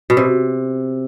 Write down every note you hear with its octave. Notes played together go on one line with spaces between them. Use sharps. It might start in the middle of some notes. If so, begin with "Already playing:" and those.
B2
C3